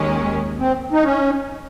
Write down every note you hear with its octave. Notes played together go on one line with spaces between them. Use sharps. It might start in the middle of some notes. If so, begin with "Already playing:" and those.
Already playing: D#2 D#3 G#3 C#4
C4
D#4
C#4